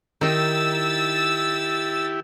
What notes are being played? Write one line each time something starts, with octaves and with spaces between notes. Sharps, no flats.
D#3 D#4 E4 G4 E6 A6